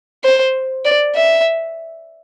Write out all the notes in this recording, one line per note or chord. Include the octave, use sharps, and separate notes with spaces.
C5
D5
E5